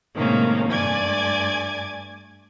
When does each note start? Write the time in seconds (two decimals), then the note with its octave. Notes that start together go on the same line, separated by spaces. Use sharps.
0.14 A2 C3 D#3 G#3 A#3 C#4
0.70 G2 A3 D5 G#5 D6 G#6